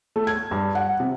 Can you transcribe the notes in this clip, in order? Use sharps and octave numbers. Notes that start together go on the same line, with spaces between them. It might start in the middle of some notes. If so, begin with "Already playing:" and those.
A3
G#6
G2
F#5
C3